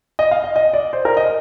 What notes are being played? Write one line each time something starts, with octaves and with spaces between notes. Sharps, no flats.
D#5
F5
D#5
D#5
D5
C5
A#4
D#5